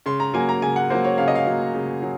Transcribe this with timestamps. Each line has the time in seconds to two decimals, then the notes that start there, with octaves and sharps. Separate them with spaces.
0.06 C#3 C6
0.20 A#5
0.33 F#3 A#3 G#5
0.49 A#5
0.62 C#3 G#5
0.76 F#5
0.90 F#3 A#3 C5
1.04 C#5
1.18 C#3 F5
1.28 D#5
1.35 F5
1.46 F#3 A#3
1.74 C#3
2.02 F#3